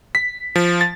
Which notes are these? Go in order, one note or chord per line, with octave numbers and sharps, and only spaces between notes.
B6
F3
A6